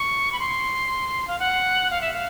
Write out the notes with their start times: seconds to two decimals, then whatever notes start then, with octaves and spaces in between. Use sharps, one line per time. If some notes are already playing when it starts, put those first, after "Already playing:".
Already playing: C#6
0.32 B5
0.39 C6
1.28 F5
1.39 F#5
1.91 F5
2.01 E5
2.14 F5